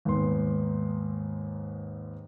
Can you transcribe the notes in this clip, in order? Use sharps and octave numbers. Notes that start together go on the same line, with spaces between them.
D#2 G#2 B3 C6